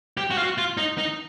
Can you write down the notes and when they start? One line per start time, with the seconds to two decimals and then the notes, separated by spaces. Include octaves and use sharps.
0.17 G4
0.31 F#4
0.38 F4
0.44 F#4
0.58 F4
0.77 D#4
0.98 D#4